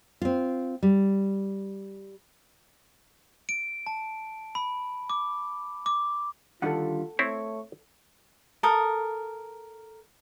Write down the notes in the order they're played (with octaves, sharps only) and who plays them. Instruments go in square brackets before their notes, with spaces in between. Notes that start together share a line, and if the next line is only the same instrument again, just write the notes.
[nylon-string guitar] C4 F4
G3
[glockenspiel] D7
A5
B5
D6
D6
[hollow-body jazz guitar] D3 D#3 G3 [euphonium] F4 [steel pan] A4 F#5
[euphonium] A3 [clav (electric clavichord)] C4 E4 [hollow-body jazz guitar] C#5
[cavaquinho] A4 A#4 D#6